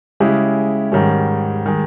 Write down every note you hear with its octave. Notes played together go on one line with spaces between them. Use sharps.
C#3 G#3 C#4 E4 G4
G#2 D#3 G3 C#4
D#3 G#3